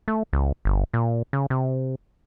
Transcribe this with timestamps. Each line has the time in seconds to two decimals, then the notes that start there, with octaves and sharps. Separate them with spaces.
0.08 A3
0.33 C#2
0.65 G1
0.94 A#2
1.33 C#3
1.50 C3